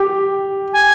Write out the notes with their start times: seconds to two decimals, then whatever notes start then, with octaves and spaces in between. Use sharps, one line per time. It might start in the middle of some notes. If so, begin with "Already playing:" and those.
Already playing: G4
0.73 G#5